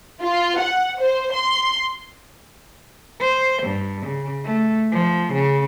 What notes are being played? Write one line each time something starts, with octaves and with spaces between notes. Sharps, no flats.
F4
F#5
C5
C6
C5
G2
C#3
A3
F3
C#3